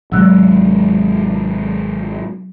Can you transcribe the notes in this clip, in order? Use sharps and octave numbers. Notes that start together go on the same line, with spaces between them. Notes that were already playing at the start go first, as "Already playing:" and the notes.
G#1 C3 F#3 G#3 E6 F#6